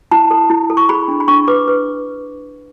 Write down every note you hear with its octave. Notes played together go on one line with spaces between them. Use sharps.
E4 A5
A4
E4
A4
C#6
G#4 B5
D4
B5
D4 C#6
B4 D6
B4